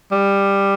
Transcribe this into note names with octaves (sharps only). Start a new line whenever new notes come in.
G3